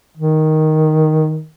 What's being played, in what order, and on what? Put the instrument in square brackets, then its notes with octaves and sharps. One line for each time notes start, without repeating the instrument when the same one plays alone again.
[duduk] D#3